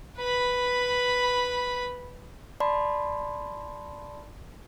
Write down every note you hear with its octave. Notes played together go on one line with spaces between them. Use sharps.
B4 B5
D5 A5 B5 C6